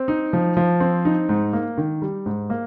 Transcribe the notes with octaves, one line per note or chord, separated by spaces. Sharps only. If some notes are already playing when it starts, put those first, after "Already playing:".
Already playing: C4
D#4
F3
F3
C4
D#4
G#2
A#3
D#3
G3
G#2
A#3